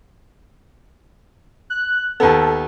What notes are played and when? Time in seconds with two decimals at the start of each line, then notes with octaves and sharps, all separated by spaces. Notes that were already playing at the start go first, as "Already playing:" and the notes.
1.70 F#6
2.20 D#2 B3 A4